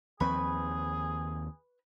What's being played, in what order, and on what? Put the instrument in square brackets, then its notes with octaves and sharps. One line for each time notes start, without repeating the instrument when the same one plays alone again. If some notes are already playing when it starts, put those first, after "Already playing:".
[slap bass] D#2 F3 C4 [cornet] G#4 [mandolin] B4 B5 C#6